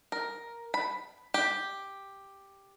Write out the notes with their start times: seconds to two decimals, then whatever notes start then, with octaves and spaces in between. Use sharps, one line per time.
0.12 A#4
0.74 B5
1.34 G4